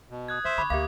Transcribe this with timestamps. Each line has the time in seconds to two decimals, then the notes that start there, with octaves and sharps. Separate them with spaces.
0.10 B2
0.28 D#6 F#6 G#6
0.45 D3 C5 E5
0.58 D3 B5 C#6 D6
0.70 D2 A#3 G4 E5 F5 D6